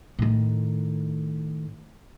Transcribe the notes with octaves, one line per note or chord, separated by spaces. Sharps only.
A2 D#3